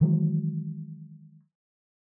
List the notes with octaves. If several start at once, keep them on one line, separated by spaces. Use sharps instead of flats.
D#3 E3 F#3 G#3